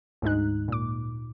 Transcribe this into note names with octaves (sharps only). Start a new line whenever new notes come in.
D2 G#2 G#3 D#4 F#6
A#2 D6